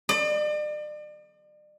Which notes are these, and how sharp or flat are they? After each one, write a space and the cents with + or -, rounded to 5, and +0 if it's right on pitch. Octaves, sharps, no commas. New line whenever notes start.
D5 +40